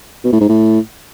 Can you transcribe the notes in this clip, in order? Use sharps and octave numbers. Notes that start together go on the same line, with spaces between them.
B2
A2
G#2
A2